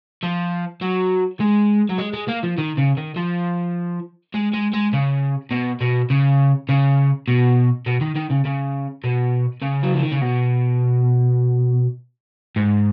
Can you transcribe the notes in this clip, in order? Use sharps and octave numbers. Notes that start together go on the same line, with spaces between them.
F3
F#3
G#3
F#3
G#3
G#3
A#3
F3
D#3
C#3
D#3
F3
G#3
G#3
G#3
C#3
B2
B2
C#3
C#3
B2
B2
D#3
D#3
C#3
C#3
B2
C#3
F#3
F3
D#3
C#3
B2
G#2